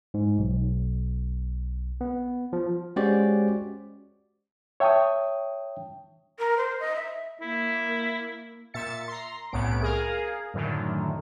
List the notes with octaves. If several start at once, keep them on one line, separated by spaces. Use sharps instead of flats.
G#2
B1
B3
F3
G#3 C#4 F#4 G4 C5 D5
C#5 E5 G5 A5 C#6 D#6
A#4
C5
D#5
E5
A#3 E4
A#2 E5 A6 C#7
A#5 C6
C2 A2 B3 C#4 D7
G#4 A#4 F5
F#2 A2 D3 D#3